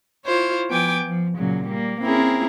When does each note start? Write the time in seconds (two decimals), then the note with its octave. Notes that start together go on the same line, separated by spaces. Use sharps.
0.26 E4 F4 C5 C#5
0.69 F3 B3 G5 G#5 D6
1.04 F3
1.37 A#2 C#3 F#3
1.69 G3 A#3
2.02 A#3 C4 C#4 E4 G#4 A#4